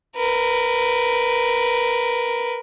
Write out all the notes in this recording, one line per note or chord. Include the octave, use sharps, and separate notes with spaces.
A#4 B4